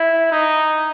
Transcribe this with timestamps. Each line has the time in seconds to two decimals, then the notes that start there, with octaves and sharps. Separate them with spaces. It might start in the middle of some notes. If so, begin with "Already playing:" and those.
Already playing: E4
0.31 D#4